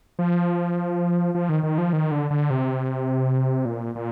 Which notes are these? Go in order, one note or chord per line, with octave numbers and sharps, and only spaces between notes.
F3
F3
D#3
D#3
F3
D#3
D3
D3
C3
A#2
A#2